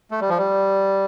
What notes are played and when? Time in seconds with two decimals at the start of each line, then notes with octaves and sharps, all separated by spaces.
0.11 A3
0.21 G3
0.29 F3
0.38 G3